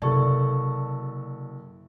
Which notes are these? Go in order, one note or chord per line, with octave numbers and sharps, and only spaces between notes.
F#1 C3 A4 D5 A5 C#6